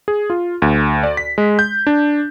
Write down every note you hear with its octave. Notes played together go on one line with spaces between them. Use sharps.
G#4
F4
D2
D5
B6
G#3
G6
D4